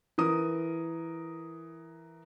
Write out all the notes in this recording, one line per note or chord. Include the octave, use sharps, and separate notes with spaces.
E3 A#4 D#6